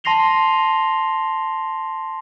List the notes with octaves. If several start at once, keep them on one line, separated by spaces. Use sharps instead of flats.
A5 C6 A#6 C7 F7 G7